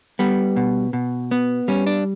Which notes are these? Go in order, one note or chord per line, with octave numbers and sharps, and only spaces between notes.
G3 B3
B2
B2
B3
G3 C#4
D4